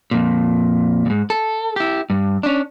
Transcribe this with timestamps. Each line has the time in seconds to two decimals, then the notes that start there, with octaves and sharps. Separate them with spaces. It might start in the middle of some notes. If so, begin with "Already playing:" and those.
0.11 F2 A#2
1.06 E2 G#2
1.30 A4
1.76 E4 G4
2.10 G2
2.43 C#4 D4